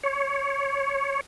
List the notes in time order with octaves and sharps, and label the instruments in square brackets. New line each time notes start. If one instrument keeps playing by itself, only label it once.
[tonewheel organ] C#5